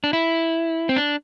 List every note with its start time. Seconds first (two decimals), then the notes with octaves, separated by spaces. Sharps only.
0.04 D4
0.13 E4
0.89 C4
0.96 D4